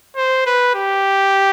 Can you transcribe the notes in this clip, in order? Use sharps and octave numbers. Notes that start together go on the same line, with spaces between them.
C5
B4
G4